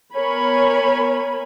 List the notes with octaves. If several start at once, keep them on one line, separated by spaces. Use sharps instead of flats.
B3 A#4 C#5 G#5 B5